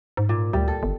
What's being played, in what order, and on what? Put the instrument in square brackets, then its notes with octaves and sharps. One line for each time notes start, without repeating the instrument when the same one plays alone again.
[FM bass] G#2
[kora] A#2
[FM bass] D2 [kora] G3
[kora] A4
[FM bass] G1